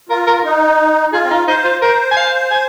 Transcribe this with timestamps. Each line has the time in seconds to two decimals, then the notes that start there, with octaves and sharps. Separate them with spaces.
0.09 F4 A#4
0.27 A#4
0.44 D#4
1.13 F4 G#4
1.25 C4
1.31 D#4
1.48 D#4 C5
1.64 F4
1.81 A#4 C5
2.11 G#5
2.17 F5
2.51 G#5